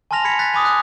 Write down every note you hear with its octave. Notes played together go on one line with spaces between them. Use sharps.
G#5 A5 C6 F6 A#6 F7
B5 G#6 A#6 B6 C#7 F7
F#6 A6 B6
G#5 B5 D6 D#6
F#6